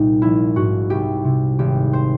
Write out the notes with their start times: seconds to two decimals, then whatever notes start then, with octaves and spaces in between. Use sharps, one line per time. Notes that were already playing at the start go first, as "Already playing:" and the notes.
Already playing: C2 A#2 D#4
0.22 A#1 E4
0.56 G#2 F#4
0.90 C2 G4
1.24 C3
1.59 G#1 G4
1.93 C5